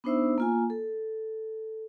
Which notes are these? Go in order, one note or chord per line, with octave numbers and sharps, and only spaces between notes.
B3 D4 D#4 C5 E5 E6
A#3 F4 G#5
A4